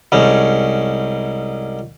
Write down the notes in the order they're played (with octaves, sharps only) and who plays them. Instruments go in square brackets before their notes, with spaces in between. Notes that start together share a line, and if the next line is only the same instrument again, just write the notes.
[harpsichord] C2 G#2 C#4